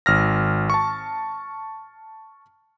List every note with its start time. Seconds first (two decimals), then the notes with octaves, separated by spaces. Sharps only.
0.06 G#1 F6 A#6
0.70 A5 C#6